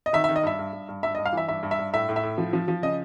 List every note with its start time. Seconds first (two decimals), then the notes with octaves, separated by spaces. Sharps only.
0.06 D#5
0.13 D#3 E5
0.24 E5
0.29 D#3
0.36 D#5
0.43 G2 E5
0.59 G2
0.73 G2
0.89 G2
1.03 G2 E5
1.15 D#5
1.18 G2
1.25 F5
1.33 E3 E5
1.48 G2 E5
1.63 G2
1.71 E5
1.79 G2
1.93 A2 E5
2.09 A2
2.16 E5
2.23 A2
2.38 F3
2.53 F3
2.68 F3
2.82 C#3 D#5